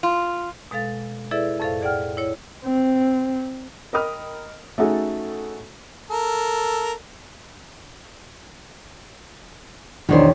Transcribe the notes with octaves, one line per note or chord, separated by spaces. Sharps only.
F4
B2 G#3 A4 F5 A6
E4 G#4 A4 B4 D5 E5
F2 A2 A4 C5 F5
G#4 D5 F#5 G5 F6
E4 C#5
C4
A#4 D#5 G5 B5 D#6 F6
A3 C#4 D#4 F#4 G#4 A4
A4 A#4
B1 E2 D#3 D4 C5